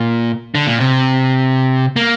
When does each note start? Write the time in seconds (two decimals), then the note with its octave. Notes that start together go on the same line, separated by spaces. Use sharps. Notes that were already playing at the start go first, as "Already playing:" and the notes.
Already playing: A#2
0.55 D3
0.67 A#2
0.80 C3
1.96 A#3